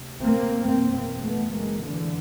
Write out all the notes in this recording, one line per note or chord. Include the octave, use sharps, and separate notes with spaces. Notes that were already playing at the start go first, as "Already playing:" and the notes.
Already playing: D2 C3
A#3 C4
F#1 E2 B2 A#3 C4
A#3 C4
A3 B3
G#3 A#3
D3 E3